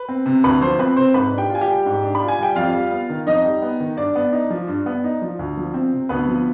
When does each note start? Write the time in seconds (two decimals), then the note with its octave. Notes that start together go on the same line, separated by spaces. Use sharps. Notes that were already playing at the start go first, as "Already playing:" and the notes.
Already playing: B4
0.08 C4
0.26 C3
0.44 D2 B4 B5
0.62 F3 C5 C6
0.79 C4 B4 B5
0.96 C3 C5 C6
1.14 G#2 B4 B5
1.32 D4
1.38 G4 G5
1.49 F4
1.55 G#5
1.61 G4 G5
1.68 G3
1.86 G#2
2.03 D4
2.15 B5
2.21 F4
2.28 G#5
2.39 G3 G5
2.56 F2 F4 F5
2.74 G3
2.91 B3
3.09 D#3
3.27 F2 D#4 D#5
3.44 G3
3.62 B3
3.80 D#3
3.97 G2 D4 D5
4.16 B3
4.33 D#4
4.50 F3
4.68 G2
4.86 B3
5.04 D#4
5.22 F3
5.39 D2
5.57 F3
5.74 C4
5.93 C3
6.09 D2 B3 B4
6.28 F3